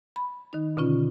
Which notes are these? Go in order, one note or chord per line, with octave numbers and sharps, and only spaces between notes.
B5
D#3 D#4
B2 D3 C#4 F4